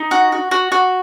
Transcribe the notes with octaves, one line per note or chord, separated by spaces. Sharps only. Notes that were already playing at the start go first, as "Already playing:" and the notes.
Already playing: D#4
F#4
F#4
F#4
F#4